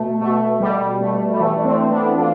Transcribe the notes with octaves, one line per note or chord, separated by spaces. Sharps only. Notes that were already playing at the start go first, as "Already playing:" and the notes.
Already playing: B2 A3
B2 A3
B2 G3
B2 A3
G3
E3 A3
D4
A3 C4
E3
B3 D4
E3 D4 F4